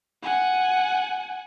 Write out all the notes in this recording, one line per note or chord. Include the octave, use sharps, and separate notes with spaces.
F#5 G#5